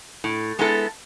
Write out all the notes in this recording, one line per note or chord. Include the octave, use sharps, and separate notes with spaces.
A2
G#3 B3 E4 A4